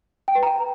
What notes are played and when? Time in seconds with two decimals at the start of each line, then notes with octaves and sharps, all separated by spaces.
0.28 G5
0.35 B4
0.43 A#5